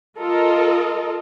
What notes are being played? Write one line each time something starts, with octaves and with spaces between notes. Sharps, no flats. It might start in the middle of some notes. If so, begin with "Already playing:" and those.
F4 A4 A#4 D#5